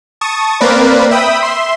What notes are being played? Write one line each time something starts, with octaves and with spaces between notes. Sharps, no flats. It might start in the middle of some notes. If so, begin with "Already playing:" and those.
A5 C#6 D#6
A#3 C4 A#4 B4 D5
E5 G5 B5 D#6
E5 C6